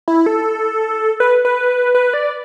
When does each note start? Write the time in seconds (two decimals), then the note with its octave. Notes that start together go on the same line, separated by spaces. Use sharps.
0.08 E4
0.26 A4
1.20 B4
1.45 B4
1.95 B4
2.14 D5